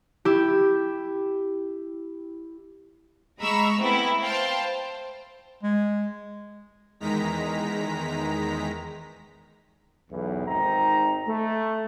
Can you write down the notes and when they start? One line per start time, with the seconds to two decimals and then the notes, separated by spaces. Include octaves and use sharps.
0.25 E4 G4
3.40 G#3 A#5 B5 C#6 E6
3.79 A3 B3 C4 E4
4.22 C5 F5 G5 A5 C6
4.62 C5
5.63 G#3
7.00 E2 D#3 G#3 A#5 B6
10.11 B1 E2
10.47 G#1 C4 D#4 A#5
11.28 A3